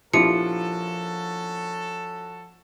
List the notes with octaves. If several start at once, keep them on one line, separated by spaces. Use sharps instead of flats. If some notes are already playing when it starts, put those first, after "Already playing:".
A#1 F3 C#4 E4 F#4 G4 A4 C#7